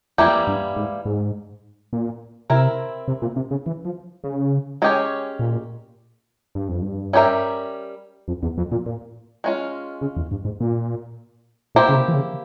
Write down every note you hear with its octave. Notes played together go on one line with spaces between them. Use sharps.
F2 E3 G3 A#3 E4 G4
G2
G#2
G#2
A#2
C3 C4 E4 A#4
C3
A#2
C3
C#3
E3
F3
C#3
G#3 C#4 G4 C#5
A#2
G2
F2
G2
G3 C#4 G4 A#4 E5
F2
E2
F2
A#2
A#2
G#3 C#4 F4
C#3
E2
G2
G#2
A#2
A#2 A#3 E4 G4 C5
C#3
C3
E3
C#3